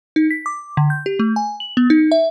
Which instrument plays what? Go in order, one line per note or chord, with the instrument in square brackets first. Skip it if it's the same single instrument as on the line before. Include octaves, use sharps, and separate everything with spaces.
[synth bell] D#4
B6
D6
D3
G6
G4
A3
G#5
F#7
B3
D#4
E5